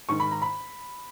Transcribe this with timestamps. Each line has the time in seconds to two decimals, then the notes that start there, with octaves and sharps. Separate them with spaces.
0.09 G#2 D#3 C#6
0.20 B5
0.31 A#5
0.42 B5